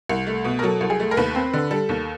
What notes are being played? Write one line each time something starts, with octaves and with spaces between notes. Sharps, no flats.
C2
A3
B2
A#4
F#3 A4
C2
G#4
A3
A#4
D#2 B4
C4
D3
G3 A4
D#2